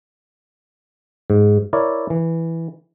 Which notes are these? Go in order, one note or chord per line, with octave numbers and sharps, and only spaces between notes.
G#2
E4 A#4 C#5 D5
E3